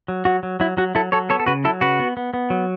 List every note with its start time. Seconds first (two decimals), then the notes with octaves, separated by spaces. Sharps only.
0.08 F#3
0.25 F#3 F#4
0.43 F#3
0.60 F#3 E4
0.77 F#3 F#4
0.95 F#3 E4 A4
1.12 F#3 A4 C#5
1.29 B3 A4 C#5
1.40 A4
1.46 C#3 F#4 B4
1.64 F#3 E4 A4
1.81 C#3 F#4 B4
2.00 B3
2.17 B3
2.34 B3
2.50 F#3